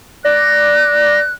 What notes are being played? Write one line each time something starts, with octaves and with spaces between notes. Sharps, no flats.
D5 F#6 A#6